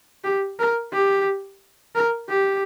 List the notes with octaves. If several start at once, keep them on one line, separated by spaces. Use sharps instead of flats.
G4
A#4
G4
A#4
G4